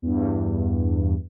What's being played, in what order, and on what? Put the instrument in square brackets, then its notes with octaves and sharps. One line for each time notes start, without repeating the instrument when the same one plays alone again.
[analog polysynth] E2 G2